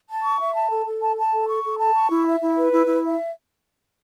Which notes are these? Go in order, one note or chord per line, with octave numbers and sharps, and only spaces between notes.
A5
C#6
E5
A5
A4
A4
A5
A5
A4
C#6
A4
A5
C#6
E4
E5
E4
B4
E4
E4
E5